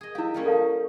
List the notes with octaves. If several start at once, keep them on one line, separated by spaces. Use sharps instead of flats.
G#4 D#5
E4 G4 E5 F5
G3 A#3 C#4
A4 F5 A5